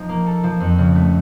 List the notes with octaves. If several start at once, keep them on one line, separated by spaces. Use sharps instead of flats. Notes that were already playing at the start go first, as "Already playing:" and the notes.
Already playing: F3 D#4
A#3
A4
F3
F2
C#3
A3